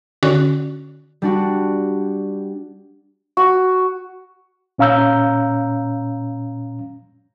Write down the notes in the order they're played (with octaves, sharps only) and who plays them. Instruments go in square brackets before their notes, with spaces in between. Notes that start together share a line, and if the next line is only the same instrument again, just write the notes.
[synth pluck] D3 C#4 F#4
[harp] G3 D4 F#4
[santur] F#4
[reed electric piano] A#2 C#4 F5 A#5 E6 G6